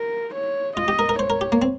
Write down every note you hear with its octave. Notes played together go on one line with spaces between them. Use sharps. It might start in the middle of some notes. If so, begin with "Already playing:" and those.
Already playing: A#4
C#5
F4 D#5
G4
A#4
A#4
C5 C#5
A#4
G4
A#3
C4